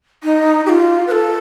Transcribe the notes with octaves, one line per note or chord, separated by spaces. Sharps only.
D#4
G4
F4
B4
A4